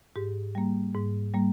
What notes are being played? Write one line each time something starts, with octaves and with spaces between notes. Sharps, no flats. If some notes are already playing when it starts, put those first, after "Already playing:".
G#2 G4
G3 A#3
G#2
G3 A#3